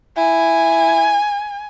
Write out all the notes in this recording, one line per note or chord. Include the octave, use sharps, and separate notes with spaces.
E4 G#5